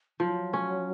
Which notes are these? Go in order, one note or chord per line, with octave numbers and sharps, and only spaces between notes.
F3 F#3
C#4